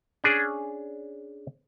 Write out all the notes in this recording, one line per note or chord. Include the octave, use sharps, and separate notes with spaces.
C#4 D4 G#4